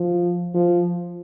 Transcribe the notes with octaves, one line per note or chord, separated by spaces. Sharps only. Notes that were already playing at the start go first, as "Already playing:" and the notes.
Already playing: F3
F3